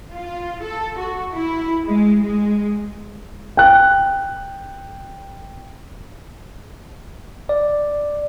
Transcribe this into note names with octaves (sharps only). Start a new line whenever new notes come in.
F4
A4
F#4
E4
G#3
G#3
G5 F#6
D5